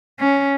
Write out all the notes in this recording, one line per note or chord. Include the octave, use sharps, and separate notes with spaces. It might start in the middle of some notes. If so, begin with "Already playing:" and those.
C#4